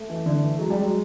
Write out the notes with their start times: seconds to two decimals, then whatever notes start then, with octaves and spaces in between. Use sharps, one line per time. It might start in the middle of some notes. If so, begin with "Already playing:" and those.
Already playing: A3
0.10 E3
0.26 D3
0.43 E3
0.59 F#3 G#3
0.70 G3
0.82 F#3